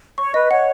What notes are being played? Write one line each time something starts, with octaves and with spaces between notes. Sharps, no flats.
C#5 C#6
B4 D#5
C#5 F#5